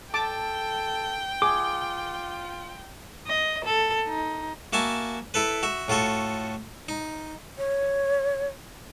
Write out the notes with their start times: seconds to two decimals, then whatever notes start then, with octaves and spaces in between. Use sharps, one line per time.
0.14 A4 G5 A5 D6
1.42 F4 G#4 D6
3.26 D#5
3.65 A4
4.07 D#4
4.73 A#3 F#4 E5 G#5 A5
5.34 E4 A4 B4
5.63 F#4 E5
5.88 A2 F4 F#4 A4 C#6
6.89 D#4
7.58 C#5